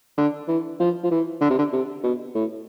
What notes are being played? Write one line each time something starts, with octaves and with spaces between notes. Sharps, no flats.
D3
E3
F3
F3
E3
D3
C3
D3
C3
B2
A2